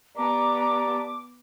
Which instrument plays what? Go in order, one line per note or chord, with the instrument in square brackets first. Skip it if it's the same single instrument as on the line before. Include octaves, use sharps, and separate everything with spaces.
[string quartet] B3 [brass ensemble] G4 D5 A5 [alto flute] A#5 [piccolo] D6